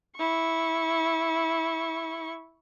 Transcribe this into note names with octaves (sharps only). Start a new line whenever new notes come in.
E4 C#6